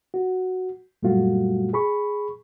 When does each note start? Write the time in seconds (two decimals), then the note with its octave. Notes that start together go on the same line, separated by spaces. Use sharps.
0.14 F#4
1.03 F#2 A#2 G3 A3 F4 F#4
1.73 G#4 B5 C#6